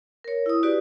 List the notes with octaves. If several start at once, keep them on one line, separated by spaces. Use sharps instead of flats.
A#4 C#5
E4 D#6
F#4 G4 B4 D5